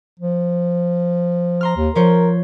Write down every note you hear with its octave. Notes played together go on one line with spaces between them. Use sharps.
F3
A#5 C6 F6
D#2
F3 A#4 C5 C#5